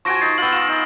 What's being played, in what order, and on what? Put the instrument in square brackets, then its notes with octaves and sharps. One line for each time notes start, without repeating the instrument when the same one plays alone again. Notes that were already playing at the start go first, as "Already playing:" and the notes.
[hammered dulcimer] F3 F#4 G#5 [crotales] C#6 A#6 D7
[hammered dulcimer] D#4 [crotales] A6 C7
[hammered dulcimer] B3 F4 [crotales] E6 A6 F#7
[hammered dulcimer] F4 [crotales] E7
[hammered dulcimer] D#4 [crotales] A#6